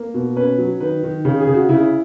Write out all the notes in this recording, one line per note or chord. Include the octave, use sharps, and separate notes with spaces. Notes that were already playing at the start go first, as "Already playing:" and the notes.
Already playing: A#3
B2
C#4 B4
F#3
D#3 B4
D#3
C#3
G#4
C#3
F#4
C#3 E4